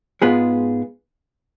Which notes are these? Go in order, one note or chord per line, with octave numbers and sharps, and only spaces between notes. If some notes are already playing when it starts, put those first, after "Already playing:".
G#2 G#3 B3 F4 G#4